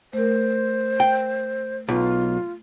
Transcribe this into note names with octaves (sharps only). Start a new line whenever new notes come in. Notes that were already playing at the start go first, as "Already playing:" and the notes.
A3 A#4 C5
G5
B1 F4